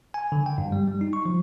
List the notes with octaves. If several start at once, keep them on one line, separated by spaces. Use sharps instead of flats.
G#5
D3
G5
G2
G3
G3
D#4
C#6
F3